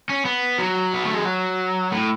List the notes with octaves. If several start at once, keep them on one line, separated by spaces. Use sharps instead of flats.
C#4
B3
F#3
B3
A3
G#3
F#3
A2